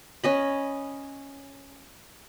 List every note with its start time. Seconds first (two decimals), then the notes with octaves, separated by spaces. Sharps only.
0.24 C#4 D#5 B5